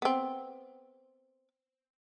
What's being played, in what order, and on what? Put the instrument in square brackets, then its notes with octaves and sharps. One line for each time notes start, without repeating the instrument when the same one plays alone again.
[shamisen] B3 C4